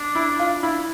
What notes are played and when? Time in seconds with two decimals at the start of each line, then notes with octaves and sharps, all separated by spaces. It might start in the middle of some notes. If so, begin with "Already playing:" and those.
Already playing: D4
0.15 E4
0.39 F4
0.63 E4